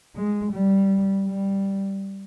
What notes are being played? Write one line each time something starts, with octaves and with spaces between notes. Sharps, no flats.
G#3
G3
G3